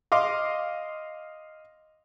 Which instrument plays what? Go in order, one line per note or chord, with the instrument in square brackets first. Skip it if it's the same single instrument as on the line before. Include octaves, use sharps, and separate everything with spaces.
[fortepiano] D#5 F5 C6 D6